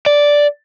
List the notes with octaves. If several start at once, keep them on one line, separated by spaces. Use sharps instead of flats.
D5